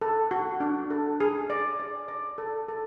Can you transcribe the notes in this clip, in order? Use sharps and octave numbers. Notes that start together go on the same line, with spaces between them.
A4
F#4
D4
A4
G#4
D5
D5
D5
A4
A4